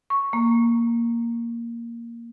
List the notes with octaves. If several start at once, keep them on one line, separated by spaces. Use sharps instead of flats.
C#6
A#3